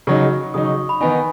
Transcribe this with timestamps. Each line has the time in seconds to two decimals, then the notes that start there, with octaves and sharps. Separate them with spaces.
0.07 C#3 F#3 D#4 C#6
0.54 C#3 F#3 D#4 D#6
0.66 C#6
0.89 B5
1.01 D#3 B3 D#4 G#5